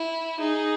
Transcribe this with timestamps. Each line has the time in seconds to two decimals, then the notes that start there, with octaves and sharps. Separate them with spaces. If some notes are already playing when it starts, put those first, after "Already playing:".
Already playing: E4
0.40 D#4 G#4